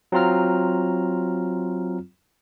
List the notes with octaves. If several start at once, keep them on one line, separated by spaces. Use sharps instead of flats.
F#3 C4 F4 A#5 F6